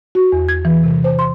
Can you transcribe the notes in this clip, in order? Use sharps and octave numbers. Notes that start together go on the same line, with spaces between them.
F#4
E2
G#6
E3
C3
C5
C6